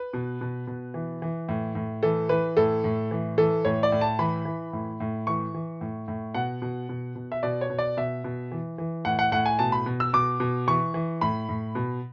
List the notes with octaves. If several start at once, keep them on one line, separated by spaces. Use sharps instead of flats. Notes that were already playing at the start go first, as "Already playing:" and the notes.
Already playing: B4
B2
B2
B2
E3
E3
A2
A2
E3 A4
E3 B4
A2 A4
A2
E3
E3 A4
A2 C#5
D5
A2
A5
E3 B5
E3
A2
A2
E3 C#6
E3
A2
A2
B2 F#5
B2
B2
B2
E5
B2 D5
C#5
B2
D5
B2 E5
B2
E3
E3
A2 F#5
F#5
A2 F#5
G#5
B2 A5
B5
B2
E6
B2 D6
B2
E3 C#6
E3
A2 B5
A2
B2